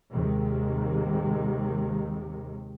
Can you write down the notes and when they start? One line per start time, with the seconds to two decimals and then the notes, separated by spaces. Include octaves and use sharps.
0.12 D#2 G#2 C3 D#3